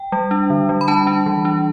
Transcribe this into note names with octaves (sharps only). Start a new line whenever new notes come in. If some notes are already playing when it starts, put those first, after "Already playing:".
Already playing: G5
G3
D4
D3
G3
B5
D4 A5
D4
E3
D4